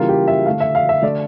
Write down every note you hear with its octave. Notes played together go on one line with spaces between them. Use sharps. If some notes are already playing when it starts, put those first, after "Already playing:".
Already playing: C#3 E3 G3 A#3 F4
G4
E5
D3 A3 F5
E5
F5
E5
D3 A3 D5